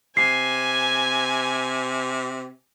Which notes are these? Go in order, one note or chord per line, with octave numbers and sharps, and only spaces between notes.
C3 G#5 C7